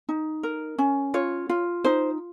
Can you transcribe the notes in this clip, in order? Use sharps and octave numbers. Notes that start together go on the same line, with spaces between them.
D#4
A#4
C#4
F4 C#5
F4
D#4 C5